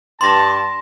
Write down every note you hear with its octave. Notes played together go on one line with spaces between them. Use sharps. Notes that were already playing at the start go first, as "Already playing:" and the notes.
G2 A5 C6 A#6